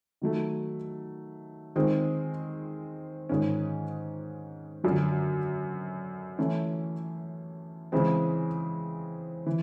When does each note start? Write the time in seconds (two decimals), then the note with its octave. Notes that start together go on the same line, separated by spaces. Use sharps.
0.22 D#3 F#3 A3
1.76 D#3 G#3 C4
3.29 G#2 D#3 G#3 C#4
4.84 F#2 D3 F#3
6.38 E3 A3 C#4 E4
7.92 C#3 E3 G#3 C4
9.46 E3